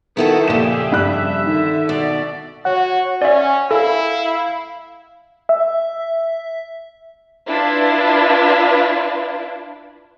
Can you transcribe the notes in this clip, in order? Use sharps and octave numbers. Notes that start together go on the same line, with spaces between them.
D#3 B3 E4 F#4 A4
F2 A#2 C#3 G4 G#4 E5 E7
G2 F#6
D3 D#3
B2 D5
F#4 C#5 F#5
C#4 D5 E5 G#5
E4 A4 F5
E5
D4 E4 F4 B4